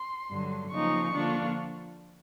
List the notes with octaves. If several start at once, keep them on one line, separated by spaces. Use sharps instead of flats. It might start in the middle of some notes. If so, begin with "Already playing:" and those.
Already playing: C6
G2 D3 F#3
C#3 F3 A#3 D#4 C#6
D3 F3 A#3 D4 F4